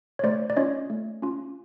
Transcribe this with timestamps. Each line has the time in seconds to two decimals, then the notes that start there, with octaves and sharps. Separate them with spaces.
0.19 C#5
0.24 A3 C5 D5
0.50 D5
0.57 C#4 F4 C#5 D#5
0.90 A3
1.22 C#4 F4